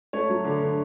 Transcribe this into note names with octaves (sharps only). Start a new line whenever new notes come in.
A3 C#5
F#3
D3
D3